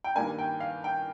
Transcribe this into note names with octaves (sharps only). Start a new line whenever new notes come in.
G5
G2 D#3 G3 A#3 D4 G#5
G5
F5
G5